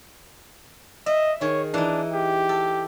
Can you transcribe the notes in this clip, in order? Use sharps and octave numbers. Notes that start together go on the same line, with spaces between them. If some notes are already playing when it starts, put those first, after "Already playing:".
D#5 E5
D#3 G#4 C#5
E3 D4 D#4
G4
A4